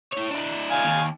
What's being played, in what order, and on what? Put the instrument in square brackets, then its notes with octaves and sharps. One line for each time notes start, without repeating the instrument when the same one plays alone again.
[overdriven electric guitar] E4 C#5
D4 E4
[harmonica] F5 G#5
[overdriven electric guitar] D#2